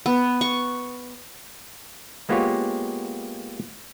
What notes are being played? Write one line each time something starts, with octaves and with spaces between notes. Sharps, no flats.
B3
C#6
G#3 A#3 B3 F4 G4 C#5